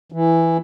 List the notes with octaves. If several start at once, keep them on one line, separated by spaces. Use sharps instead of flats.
E3